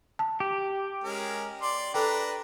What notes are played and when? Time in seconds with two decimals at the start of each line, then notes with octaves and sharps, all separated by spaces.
0.19 A5
0.40 G4
1.04 G#3 C#4 A#4
1.62 D5 C6
1.94 D4 A4 B4 G5 A#5